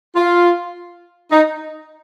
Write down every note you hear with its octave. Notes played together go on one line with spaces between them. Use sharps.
F4
D#4